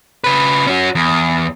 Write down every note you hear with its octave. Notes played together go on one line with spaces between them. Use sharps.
C#3 B4
C#4 F#4
E2